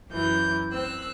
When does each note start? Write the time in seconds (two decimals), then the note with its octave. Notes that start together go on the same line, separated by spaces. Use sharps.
0.12 F#2 E3 G6
0.72 C4 E6 F#6